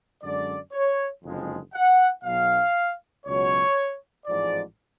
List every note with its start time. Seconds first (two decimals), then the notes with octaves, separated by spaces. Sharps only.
0.23 F#2 D3 G#3 D5
0.73 C#5
1.24 F#1 F2 D3 F3 G#3
1.74 F#5
2.24 B1 B2 F#3 F5
3.25 C#2 B2 F#3 C#5
4.26 A1 G#2 F3 G#3 D5